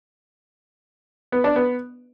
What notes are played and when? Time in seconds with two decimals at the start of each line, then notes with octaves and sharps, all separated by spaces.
1.32 B3
1.44 D4
1.56 B3